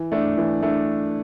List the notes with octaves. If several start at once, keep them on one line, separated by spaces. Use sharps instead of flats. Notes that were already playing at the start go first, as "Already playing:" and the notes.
Already playing: E3
A3 D4
E3
A3 D4